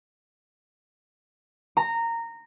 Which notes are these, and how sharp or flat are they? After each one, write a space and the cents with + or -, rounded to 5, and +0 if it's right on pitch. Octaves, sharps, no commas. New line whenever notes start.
A#5 -15